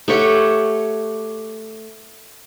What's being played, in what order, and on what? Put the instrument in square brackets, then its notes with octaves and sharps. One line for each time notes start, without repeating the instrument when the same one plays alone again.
[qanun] A3 G4 C#5 F#5